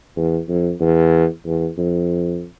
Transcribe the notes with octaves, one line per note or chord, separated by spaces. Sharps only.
E2
F2
E2
E2
F2